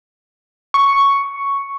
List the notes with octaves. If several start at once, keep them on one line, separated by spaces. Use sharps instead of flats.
C#6